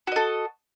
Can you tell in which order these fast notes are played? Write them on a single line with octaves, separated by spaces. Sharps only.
F#4 D#5 A4